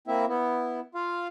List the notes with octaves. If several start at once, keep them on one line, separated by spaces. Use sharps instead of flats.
A#3 C4 E4 E5
B3 E4
F4 F5